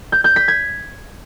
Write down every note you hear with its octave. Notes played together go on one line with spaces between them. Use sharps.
G6
G6
B6
G#6